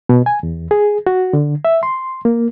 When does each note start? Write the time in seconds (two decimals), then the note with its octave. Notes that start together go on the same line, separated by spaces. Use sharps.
0.09 B2
0.26 G#5
0.43 E2
0.71 G#4
1.07 F#4
1.33 D3
1.65 E5
1.83 C6
2.25 A#3